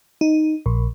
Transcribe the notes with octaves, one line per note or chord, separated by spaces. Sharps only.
D#4
A#1